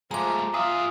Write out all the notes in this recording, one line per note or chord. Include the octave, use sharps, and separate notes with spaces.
F3 G#3 A3 A#5 D6
F4 G#4 E5 D#6